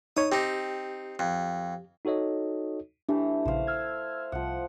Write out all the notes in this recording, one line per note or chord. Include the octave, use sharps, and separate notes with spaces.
D#4 C#5 D#6
C4 D#4 G4
F2
D#4 F#4 A4 C#5 D#5
E3 A3 D4 G4
A#1 C#3 C5 F5
E6 F6 G#6
C2 F3 F#5